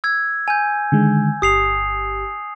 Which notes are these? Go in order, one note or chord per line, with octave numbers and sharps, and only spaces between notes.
E6 G#6
G#5 G6
D3 D#3 G#3
G1 G4 D#6 C7 F7